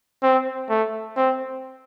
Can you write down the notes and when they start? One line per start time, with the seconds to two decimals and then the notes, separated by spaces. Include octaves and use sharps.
0.23 C4
0.70 A3
1.17 C4